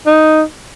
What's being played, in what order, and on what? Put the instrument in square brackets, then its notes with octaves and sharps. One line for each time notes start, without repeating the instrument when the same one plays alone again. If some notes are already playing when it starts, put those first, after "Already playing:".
[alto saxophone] D#4